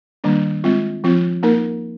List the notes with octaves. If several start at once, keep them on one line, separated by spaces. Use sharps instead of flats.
D#3 G3 A#3 D4
G#3 C4 F4
F3 C4 F4
A#3 D#4 A#4